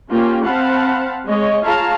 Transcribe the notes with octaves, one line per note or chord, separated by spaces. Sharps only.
A#3 C#4 F4 G4 G5
C4 F5 F#5 A5 B5
G#3 C#5 D#5
F4 G#4 C#5 F5 A5 A#5